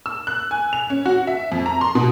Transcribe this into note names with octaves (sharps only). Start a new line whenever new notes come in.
E6
F#6
G#5
F7
C#4
F#4
E5
F2
A#5
C6
B2